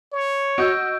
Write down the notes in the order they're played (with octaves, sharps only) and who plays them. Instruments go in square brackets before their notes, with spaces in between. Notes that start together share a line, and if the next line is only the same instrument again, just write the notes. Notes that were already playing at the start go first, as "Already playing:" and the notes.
[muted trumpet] C#5
[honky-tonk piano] F#4 D#5 [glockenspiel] E6 G6 D7